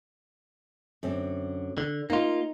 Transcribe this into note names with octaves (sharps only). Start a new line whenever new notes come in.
F#2 D3 C4
D3
A#3 D#4 F4